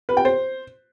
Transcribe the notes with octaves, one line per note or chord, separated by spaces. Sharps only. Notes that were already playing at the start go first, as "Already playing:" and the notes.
B4
G5
C5